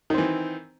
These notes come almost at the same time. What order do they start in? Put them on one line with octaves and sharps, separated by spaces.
D#3 C4 E3